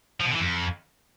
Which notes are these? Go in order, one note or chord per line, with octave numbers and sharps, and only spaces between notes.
F3
B2
D3
E3
F2